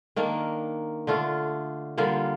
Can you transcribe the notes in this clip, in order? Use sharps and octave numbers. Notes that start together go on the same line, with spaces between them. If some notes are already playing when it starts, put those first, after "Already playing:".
D#3 A#3 D4
D3 A3 D4 F4
D3 G3 A#3 F4